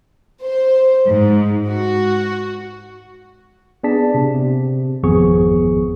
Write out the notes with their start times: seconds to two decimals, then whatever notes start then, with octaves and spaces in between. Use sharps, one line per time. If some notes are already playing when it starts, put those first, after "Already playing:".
0.43 C5
1.07 G#2
1.68 F#4
3.84 B3 D4 G#4 D5 A5 B6
4.14 C3
4.34 C3
5.03 G#1 F2 F3 B3 G#4 C#6